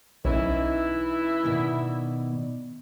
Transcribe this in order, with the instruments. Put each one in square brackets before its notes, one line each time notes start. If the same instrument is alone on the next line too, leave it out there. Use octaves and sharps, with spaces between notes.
[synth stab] B1 [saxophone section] E3 E4 [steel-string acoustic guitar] C#4 D#4
[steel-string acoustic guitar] B2 D#3 D5